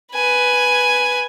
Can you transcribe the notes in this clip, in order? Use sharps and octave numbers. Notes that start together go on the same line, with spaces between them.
B4 G#5